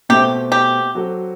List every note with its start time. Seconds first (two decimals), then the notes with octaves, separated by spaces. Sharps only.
0.09 B2 A3 C4 G4
0.52 G4
0.95 F#3 C4 F#4 A4